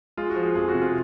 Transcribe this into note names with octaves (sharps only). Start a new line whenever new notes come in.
G#3 F4
F#4
F3
G#4
F2 G#4
F#4
C3
F4